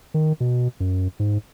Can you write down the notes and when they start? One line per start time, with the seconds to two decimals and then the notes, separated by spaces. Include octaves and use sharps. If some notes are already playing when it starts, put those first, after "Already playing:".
0.14 D#3
0.40 B2
0.80 F#2
1.19 G#2